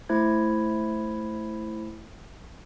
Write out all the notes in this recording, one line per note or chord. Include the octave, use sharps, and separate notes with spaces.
A3 E4 C5 G#6